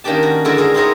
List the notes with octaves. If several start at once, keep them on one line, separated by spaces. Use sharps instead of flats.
D#3 A#3 C#4 D4 G4 A5
F#4
D3 G#3 E4 F#4 A4 A#4
E4 G#4 A#4
C4 D#4 E4 G#4 A#4 C#5